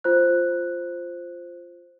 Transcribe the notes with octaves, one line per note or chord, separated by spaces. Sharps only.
F4 C5 F#6